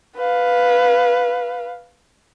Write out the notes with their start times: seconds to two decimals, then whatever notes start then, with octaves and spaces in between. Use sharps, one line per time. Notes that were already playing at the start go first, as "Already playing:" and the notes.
0.16 B4 F5